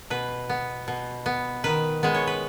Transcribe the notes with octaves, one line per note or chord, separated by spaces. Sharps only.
B2 B4
B3
B2
B3
D#3 B4
G#3 B3
C#5
B4